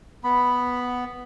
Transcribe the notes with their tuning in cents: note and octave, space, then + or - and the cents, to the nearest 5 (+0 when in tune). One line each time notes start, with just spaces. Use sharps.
B3 +0 B5 +0